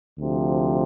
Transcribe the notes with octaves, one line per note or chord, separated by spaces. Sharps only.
D2 C3 F3